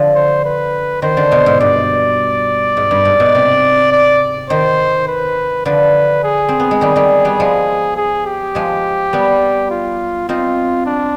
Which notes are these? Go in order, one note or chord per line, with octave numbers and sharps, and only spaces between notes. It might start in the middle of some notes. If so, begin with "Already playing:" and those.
Already playing: D3 F3
C5
B4
D#3 C5
D3
B2
G#2
G2 D5
G#2
G2
G#2
B2
C3
D5
D#3 C5
B4
D3 F3 B4
G#4
C4
B3
G#3
D#3 G3
D#3 G3
G3 B3
F3 G#3
G#4
G4
F3 G#3
G3 B3
F4
C4 D#4 F4
D4